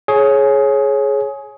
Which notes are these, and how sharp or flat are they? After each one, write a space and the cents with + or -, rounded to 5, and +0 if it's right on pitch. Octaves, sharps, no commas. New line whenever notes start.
G#4 +20 C#5 -10